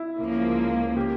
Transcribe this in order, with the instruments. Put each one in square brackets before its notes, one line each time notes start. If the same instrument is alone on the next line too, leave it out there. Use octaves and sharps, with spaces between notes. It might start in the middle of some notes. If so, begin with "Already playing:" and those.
Already playing: [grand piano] E4
[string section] C#2 C#3 F3 A#3
[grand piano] G4